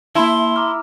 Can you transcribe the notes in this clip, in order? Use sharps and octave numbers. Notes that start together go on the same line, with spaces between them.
A#3 E4 A5 C6
A#5 D6 F6